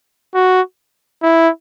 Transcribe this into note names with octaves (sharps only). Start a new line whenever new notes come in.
F#4
E4